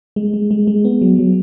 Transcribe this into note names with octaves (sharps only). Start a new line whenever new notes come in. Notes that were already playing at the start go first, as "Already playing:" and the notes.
G#3
G#3
G#3
G#3
B3
F#3
F#3